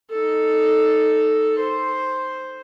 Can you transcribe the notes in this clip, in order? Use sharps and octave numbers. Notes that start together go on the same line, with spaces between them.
D#4 A4
C5